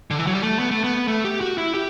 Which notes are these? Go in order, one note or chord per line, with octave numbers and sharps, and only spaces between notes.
D3
E3
F#3
G3
A3
B3
A3
B3
A3
G4
F#4
E4
G4